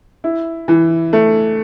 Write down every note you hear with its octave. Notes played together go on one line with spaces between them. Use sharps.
E4
E3
A3